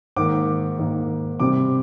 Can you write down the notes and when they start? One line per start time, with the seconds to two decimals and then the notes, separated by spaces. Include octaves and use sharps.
0.16 G#2 D#3 A#3 D6
0.79 G#2 D#3 A#3
1.40 C3 G3 C4 D6